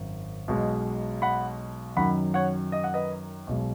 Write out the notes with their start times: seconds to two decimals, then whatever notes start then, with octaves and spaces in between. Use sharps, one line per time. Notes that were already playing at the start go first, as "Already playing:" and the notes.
Already playing: G#1 F#2
0.48 B1 B2 G#3
1.22 F#5 B5
1.97 F#2 D#3 F#3 F#5 B5
2.34 C#5 F#5
2.72 D#5
2.84 F#5
2.94 B4 D#5
3.47 B1 B2 G#3